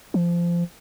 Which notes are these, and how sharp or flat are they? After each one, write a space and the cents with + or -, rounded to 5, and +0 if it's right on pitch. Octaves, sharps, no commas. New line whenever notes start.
F3 -20